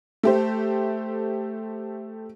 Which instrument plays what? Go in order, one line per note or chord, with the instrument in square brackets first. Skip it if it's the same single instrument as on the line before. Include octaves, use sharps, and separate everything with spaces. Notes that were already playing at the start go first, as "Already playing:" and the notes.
[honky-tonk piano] A3 G4 C5